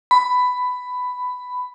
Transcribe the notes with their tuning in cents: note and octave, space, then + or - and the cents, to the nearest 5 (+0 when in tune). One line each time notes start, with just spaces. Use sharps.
B5 +10